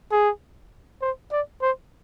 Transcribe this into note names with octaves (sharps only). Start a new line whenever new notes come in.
G#4
C5
D5
C5